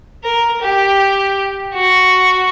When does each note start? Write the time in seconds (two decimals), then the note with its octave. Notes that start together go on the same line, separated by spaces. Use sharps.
0.24 A#4
0.62 G4
1.74 F#4